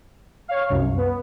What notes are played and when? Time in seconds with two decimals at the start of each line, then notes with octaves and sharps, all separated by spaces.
0.48 C#5 F5
0.70 C2 F#2
0.97 B3